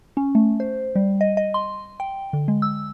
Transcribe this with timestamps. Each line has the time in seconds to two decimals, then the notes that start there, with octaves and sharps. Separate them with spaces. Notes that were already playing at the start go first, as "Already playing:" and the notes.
0.17 C#4
0.35 A3
0.60 C5
0.96 G3
1.21 D#5
1.37 D#5
1.54 C6
2.00 G5
2.33 D3
2.48 G#3
2.62 E6